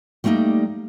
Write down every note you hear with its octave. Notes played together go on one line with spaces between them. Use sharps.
G3 A3 A#3 D4 D#4